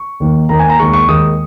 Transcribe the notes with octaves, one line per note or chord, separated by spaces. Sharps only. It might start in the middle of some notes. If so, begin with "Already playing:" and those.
Already playing: C#6
D#2 D#3 A#3
D#2 D#3 A#3 A#5
G#5
A#5
D#2 D#3 G#3 C#6
C#6
D#2 D#3 G#3 D#6